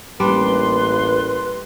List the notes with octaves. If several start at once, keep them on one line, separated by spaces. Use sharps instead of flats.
A1 G3 A#3 D4 B4 C6